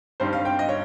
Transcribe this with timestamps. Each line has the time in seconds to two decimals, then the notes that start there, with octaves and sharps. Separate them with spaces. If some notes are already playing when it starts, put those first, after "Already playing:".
0.20 G2 G3 C4 D#4 C5
0.33 F5
0.45 G5
0.59 D#5
0.69 C#5